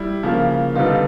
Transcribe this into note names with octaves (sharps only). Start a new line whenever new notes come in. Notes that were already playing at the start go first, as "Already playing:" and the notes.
Already playing: G3 E4
C#3 F3 A#3
D3 G3 B3 D#4 F4